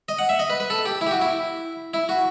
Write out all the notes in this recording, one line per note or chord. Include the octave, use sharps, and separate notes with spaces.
D#5
F#5
E5
D#5
B4
B4
A4
G4
E4
G4
F#4
E4
E4
F#4